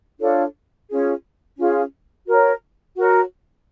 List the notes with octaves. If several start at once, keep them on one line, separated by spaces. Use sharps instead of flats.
D4 F4 A4 C#5
C#4 F4 G#4
C#4 F4 G#4
F#4 A#4 C#5
F#4 A#4 C#5